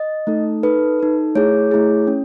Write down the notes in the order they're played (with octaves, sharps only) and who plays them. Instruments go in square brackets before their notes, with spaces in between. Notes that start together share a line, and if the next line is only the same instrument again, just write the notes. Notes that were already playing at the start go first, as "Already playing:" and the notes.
Already playing: [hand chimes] D#5
A3 D#4 A4
D#4 A4 B4
D#4 A4
A3 E4 G#4 C#5
A3 E4 G#4
C#4